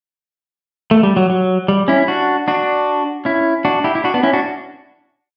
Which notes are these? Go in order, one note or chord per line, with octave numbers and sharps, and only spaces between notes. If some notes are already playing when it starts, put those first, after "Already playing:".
A3
G3
F#3
F#3
G3
C#4 E4
D4 F#4
D4 F#4
C#4 E4
D4 F#4
E4 G4
E4
D4 F#4
B3 D4
C#4 E4
D4 F#4